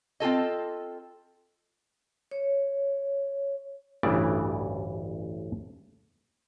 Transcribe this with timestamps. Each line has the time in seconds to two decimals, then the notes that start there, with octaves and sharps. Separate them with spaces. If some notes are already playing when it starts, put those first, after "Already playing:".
0.20 C4 F4 A4 D#5
2.31 C#5
4.03 A1 D2 G2 C#3 E3 D5